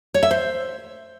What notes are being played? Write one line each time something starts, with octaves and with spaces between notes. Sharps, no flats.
C#5
E5
C5